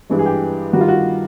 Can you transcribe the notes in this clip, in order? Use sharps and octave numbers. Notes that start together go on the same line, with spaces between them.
G2 E3 G#3
G#4
G4
G2 D#3 G3 F#4
F4
F#4